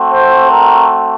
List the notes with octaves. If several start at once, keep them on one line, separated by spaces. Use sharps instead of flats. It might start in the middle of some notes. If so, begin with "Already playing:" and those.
Already playing: A3 C4 F#4
C5
A#4